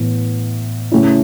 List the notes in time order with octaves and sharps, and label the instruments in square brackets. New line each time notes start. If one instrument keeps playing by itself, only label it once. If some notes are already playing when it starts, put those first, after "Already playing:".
Already playing: [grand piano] A2 E3 B3
C#3 A3 C#4 E4